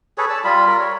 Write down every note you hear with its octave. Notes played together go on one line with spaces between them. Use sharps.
G#4 A4 B4 C#5
D5 A5 E6
G3 F4 B5
F4 A#4
C#5